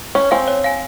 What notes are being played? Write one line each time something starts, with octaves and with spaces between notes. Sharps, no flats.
C#4 C#5
C4 F5 G#5
C#5
F5 G#5